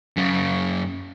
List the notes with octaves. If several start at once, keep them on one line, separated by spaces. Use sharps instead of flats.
F#2 C#3